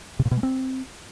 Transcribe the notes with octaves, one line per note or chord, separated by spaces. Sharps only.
C3
A#2
B2
G#3
C4